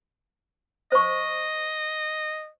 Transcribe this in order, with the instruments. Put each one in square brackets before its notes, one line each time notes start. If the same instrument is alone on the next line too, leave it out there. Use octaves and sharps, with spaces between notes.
[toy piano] C5 C#6 [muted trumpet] D#5